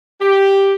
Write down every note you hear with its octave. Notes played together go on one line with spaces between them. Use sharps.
G4